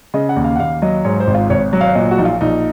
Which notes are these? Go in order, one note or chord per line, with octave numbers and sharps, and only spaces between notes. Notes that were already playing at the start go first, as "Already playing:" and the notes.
C#3 D#5
F#5
D#2
F5
F#5
D#2 F5
F#3 D#5
G#2 C#5
C5
G#1
F4
G#1 C#5
F#3
F5
A#2 D#5
F#4
A#1 D#4
F4
A#1 D#4